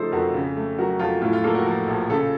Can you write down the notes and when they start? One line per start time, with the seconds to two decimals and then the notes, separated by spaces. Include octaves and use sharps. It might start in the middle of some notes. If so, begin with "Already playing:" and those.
Already playing: C#3 F3 A3 D#4 F4 A4 C5
0.12 F2 F#4 A#4
0.33 C#3
0.56 A3
0.78 F#3 F#4 A#4
0.99 F2 F4
1.21 A2 F4
1.33 F4
1.44 A#3 F4 A4
1.55 F#4 A#4
1.66 F3
1.88 A#1
2.10 C#3 F4 A4